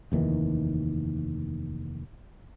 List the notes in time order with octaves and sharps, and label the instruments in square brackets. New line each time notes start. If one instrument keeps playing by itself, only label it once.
[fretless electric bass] F1 D#2 D#3 E3